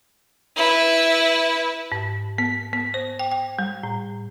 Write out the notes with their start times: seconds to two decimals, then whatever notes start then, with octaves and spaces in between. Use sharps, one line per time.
0.57 E4 B4
1.92 G#2
2.38 B3
2.73 B3
2.94 C5
3.19 G5
3.32 G5
3.59 G3
3.83 A2